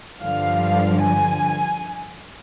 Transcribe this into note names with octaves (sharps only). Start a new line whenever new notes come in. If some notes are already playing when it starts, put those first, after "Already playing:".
G2 D3 F3 F5
G#5